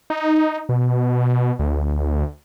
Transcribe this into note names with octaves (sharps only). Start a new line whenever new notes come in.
D#4
B2
D2